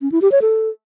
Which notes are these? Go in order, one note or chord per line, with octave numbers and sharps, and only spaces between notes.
C#4
E4
G4
C#5
A4